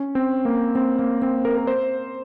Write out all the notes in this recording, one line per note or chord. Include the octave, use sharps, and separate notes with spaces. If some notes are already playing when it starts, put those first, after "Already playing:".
Already playing: C#4
C4
A#3
C4
A#3
C4
A#4
A#4
C5